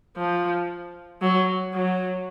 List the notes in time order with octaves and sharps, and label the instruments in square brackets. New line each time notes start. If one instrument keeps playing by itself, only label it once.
[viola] F3
F#3
F#3